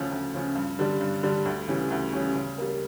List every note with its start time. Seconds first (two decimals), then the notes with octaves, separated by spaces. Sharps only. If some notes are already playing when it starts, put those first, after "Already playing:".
Already playing: D2 C#3 F3 C#4
0.11 D2
0.34 C#3 F3 C#4
0.55 G2
0.79 D3 G3 D4
1.01 G2
1.23 D3 G3 D4
1.45 D2
1.68 C#3 E3 G3 C#4
1.90 D2
2.13 C#3 E3 G3 C#4
2.35 C#3
2.58 G3 A#3